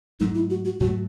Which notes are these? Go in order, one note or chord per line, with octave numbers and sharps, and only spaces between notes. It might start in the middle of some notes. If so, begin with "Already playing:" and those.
G#2 F#3 A3 D#4
E4
F#4
F#4
G#2 F#3 A3 F#4